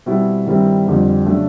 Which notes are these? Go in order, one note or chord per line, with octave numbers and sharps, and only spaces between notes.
B2 G3 C4 E4
G2 D#3 G3 C4 E4
F2 D3 G3 C4
C#3 F#3 A3 D4